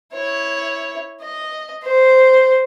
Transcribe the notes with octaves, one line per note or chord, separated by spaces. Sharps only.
E4 C#5
D#5
C5